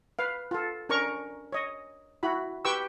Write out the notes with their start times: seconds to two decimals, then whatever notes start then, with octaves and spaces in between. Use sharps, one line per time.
0.19 B4 F5
0.51 F4 A4
0.89 C#4 D4 A#4 A#5 C#6
1.52 C#5 D#5
2.23 E4 F#4 B5
2.65 G4 B4 G5 C#6 E6